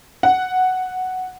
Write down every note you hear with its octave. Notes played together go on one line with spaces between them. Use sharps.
F#5